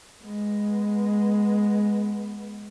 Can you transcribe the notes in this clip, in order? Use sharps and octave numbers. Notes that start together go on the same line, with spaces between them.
G#3 B3